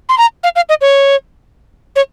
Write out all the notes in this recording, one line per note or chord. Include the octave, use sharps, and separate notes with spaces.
C6
A#5
F5
F5
D#5
C#5
C#5